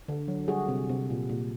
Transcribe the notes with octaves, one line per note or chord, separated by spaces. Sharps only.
D3
F#3
G3 F#4 G#4
C3
C3
A#2
A#2